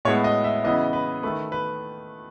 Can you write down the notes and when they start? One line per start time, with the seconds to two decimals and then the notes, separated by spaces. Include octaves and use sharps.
0.05 A2 G#3 B3 C#5
0.24 D#5
0.44 E5
0.64 C#3 E3 B3 D#5
0.93 B4
1.23 D#3 A3 B4
1.52 B4